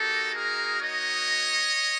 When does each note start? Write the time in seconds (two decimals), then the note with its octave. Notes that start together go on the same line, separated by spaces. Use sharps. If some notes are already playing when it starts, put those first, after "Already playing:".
Already playing: A#3 D#4 F#4 G4 A4
0.33 G#4 A#4
0.80 C#5 D#5